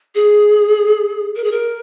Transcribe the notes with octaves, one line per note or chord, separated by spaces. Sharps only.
G#4
A#4
G#4
A#4